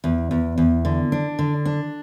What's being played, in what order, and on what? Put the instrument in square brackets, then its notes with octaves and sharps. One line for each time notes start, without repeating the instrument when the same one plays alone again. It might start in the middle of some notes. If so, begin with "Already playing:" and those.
[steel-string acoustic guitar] E2
E2
E2
D3
D4
D3
D4